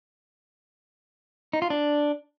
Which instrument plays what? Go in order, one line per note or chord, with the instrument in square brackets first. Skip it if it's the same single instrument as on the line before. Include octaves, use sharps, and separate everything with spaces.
[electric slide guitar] D#4
F4
D4